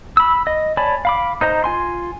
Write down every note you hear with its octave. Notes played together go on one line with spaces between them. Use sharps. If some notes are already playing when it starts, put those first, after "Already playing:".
B5 E6
D#5
C#5 D5 G#5 A5 B5
F5 B5 D6
D#4 C5 D#5 A#5
F4 G#5 C6